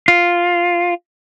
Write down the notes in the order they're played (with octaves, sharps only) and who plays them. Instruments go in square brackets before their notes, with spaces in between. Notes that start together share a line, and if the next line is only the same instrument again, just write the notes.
[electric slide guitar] F4